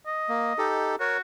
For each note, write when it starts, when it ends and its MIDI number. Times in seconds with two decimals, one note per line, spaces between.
0.07 0.68 75
0.29 0.53 58
0.58 0.96 63
0.58 0.96 67
0.58 0.96 69
1.00 1.20 66
1.00 1.17 70
1.00 1.17 73